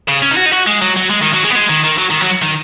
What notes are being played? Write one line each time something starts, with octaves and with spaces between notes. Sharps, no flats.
C#3
C#4
D#4
F#4
D#4
F#4
G#3
F#3
F#3
G#3
D#3
F#3
G#3
B3
G#3
D#3
D#3
F#3
D#3
F#3
D#3